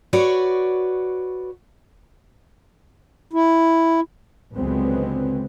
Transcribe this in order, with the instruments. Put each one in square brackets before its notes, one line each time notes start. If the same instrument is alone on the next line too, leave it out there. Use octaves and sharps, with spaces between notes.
[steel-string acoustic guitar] F#4 B4 C#5 D5
[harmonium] E4
[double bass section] C#2 D3 F#3 G#3 B3 C4